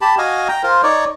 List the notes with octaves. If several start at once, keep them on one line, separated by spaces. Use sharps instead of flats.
G4 A5 B5
F#4 D#5 F5 G#5
G5 A#5
F4 A#4 C5
D#4 C#5 D5